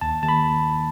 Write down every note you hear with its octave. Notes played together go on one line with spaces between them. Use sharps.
D#2 A5
D#2 A5
B5